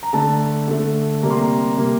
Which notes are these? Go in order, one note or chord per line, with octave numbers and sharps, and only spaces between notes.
A#5
D3 A3 A5
D3 A3
C3 G3 A#3 A#5
C6
A#5
C3 G3 A#3